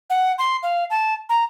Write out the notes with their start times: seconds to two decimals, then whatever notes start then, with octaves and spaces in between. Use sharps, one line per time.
0.10 F#5
0.39 C6
0.63 F5
0.90 A5
1.29 A#5